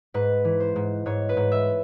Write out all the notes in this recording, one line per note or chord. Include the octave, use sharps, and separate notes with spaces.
G#2 B4
E3
C5
G#2
G#2 C#5
B4
G#2
E5